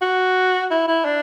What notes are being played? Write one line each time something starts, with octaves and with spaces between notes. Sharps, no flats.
F#4
E4
E4
D4